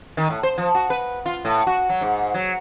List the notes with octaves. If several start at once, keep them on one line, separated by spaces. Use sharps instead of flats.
D#3
A2
C5
F3
F#4
B4
F4
A2
F#4
F#3
G#2
F#3